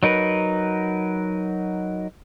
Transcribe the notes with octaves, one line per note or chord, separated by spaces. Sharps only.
F#3 D#4 A#4 B4